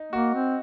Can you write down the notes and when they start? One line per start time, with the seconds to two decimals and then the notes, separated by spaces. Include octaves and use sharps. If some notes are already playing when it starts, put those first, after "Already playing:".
Already playing: D#4
0.13 A#3 F#4
0.34 C4